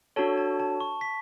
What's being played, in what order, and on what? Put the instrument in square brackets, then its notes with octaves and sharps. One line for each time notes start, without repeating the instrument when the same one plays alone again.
[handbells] D4 F#4 A4 C#5 [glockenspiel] A5
[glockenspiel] A5
A5
C#6
B6